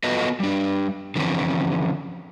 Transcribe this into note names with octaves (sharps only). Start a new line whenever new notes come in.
B3 F4 F#4 A4 B4 D#5
G3 D4
D3 E3 F3 C4 C#4